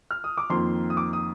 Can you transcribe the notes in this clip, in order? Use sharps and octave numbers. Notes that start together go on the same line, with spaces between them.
F6
D#6
D6
F2 D#3 A#3 C6
D#6
D6
D#6